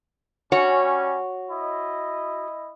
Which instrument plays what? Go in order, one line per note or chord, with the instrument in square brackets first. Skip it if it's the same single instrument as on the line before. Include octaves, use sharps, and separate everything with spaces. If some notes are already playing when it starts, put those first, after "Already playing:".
[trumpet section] G3 C#4 [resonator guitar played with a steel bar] F#4 C#5
[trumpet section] E4 D#5